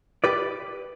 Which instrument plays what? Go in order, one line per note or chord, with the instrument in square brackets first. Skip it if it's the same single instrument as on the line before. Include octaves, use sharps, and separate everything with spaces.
[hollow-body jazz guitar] G4 B4 D5